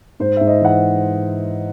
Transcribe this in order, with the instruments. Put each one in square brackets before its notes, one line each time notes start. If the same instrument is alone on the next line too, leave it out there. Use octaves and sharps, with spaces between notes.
[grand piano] G#2 C5
G#2 E5
D#5
E3 F#5